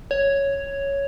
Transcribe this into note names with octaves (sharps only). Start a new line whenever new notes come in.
C#5